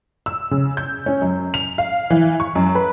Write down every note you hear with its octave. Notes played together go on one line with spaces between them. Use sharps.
E6
C#3
G6
C#4
F#2
F7
F5
E3
C#6
F#2
B4